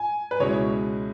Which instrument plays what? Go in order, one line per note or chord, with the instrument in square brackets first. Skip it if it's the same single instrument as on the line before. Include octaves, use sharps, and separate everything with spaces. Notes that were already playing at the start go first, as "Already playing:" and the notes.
Already playing: [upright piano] G#5
B4
[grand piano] C#2 B2 G#3 C#4 E4 [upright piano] C#5